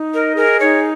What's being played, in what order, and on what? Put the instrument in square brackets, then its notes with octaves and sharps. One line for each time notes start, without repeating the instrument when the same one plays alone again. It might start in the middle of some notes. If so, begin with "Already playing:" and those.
Already playing: [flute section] D#4
[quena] A#4 [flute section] D#5
[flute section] G#4 [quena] A#4
[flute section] D#4 [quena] C#5